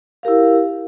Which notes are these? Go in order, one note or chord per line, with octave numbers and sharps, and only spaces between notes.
E4 G4 A#4 F5